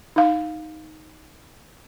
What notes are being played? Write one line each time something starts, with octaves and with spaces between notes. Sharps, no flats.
D#4 F5